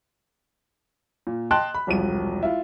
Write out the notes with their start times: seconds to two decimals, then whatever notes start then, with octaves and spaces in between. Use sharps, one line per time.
1.27 A#2
1.51 D#5 G5 A5 C6 F#6
1.75 B5
1.87 E1 C2 F3 D#7
2.43 E4 F4